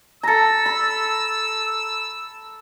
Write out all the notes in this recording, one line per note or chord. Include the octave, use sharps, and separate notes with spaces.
A4 A#5 E6
B5